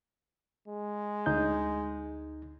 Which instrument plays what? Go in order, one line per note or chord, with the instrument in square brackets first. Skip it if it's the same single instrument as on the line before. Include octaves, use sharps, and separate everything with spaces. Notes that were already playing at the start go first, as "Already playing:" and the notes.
[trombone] G#3
[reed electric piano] D2 D#4 G6